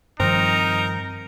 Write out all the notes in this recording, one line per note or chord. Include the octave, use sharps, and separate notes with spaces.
G2 D#3 F3 C4 D#4 A#4